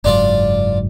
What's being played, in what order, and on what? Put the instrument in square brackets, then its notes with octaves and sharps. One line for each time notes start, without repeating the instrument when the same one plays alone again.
[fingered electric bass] F#1 G#2 F#3 [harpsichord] D4 F4 D5